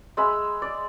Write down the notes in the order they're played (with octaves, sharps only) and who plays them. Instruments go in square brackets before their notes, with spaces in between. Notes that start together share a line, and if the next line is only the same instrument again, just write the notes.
[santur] G#3 E5 B5
D5